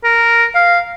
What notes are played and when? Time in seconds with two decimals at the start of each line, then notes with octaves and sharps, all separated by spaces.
0.04 A#4
0.55 F5